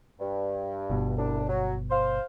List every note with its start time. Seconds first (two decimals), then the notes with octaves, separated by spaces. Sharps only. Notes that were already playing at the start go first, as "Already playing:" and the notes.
0.20 G2
0.90 G1 B2
1.17 C2 A2 D4
1.48 F#3
1.90 C5 F5